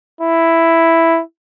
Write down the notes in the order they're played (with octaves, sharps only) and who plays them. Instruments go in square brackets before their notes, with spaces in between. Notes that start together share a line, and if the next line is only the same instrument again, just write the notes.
[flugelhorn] E4